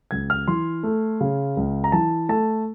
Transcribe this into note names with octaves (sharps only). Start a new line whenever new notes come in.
C#2 G#6
F6
E3 C6
A3
C#3
C#2
A#5
E3 A5
A3 A5